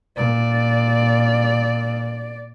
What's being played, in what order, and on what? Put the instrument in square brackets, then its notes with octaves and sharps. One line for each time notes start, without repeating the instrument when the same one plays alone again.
[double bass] A#2 [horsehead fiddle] D5